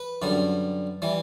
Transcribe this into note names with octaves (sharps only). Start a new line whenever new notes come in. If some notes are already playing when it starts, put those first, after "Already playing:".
Already playing: B4
F#2 D3 G3
E3 G3